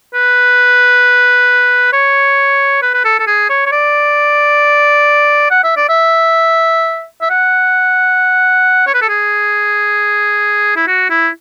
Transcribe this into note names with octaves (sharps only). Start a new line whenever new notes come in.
B4
C#5
B4
B4
A4
A4
G#4
C#5
C#5
D5
F#5
E5
D5
E5
E5
F#5
C#5
B4
A4
G#4
E4
F#4
E4